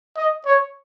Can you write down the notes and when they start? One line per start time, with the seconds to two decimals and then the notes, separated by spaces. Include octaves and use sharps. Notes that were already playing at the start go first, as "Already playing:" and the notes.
0.17 D#5
0.46 C#5